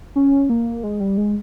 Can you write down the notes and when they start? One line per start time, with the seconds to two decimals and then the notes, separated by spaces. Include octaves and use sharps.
0.16 C#4
0.49 A#3
0.83 G#3
1.00 G3
1.17 G#3